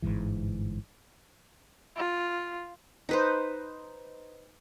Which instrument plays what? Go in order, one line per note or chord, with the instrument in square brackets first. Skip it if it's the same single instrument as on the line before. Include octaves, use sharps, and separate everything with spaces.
[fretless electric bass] G1 C#2 G#2 E3
[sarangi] F4
[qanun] D#4 B4 C5